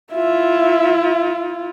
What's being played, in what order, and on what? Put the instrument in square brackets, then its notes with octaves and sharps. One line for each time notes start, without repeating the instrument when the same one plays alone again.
[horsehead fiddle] E4 F4 [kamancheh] E5